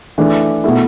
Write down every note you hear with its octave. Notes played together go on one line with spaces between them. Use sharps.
E3 A3 D4
B2 A3 E4